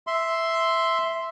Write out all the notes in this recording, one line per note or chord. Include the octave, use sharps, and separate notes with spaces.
E5 C6